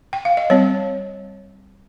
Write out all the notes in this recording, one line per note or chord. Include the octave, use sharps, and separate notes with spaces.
G5
F5
D#5
G3 C4 C#5